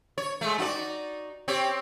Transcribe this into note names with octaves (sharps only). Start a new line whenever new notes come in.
C#5
G#3 A3
D#4 F#4 D5
C4 G4 C#5